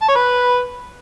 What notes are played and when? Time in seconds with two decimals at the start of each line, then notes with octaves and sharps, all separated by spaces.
0.02 A5
0.09 C#5
0.15 B4